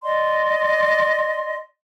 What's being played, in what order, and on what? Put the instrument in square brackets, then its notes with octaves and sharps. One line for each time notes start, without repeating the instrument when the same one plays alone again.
[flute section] D5 D#5 C6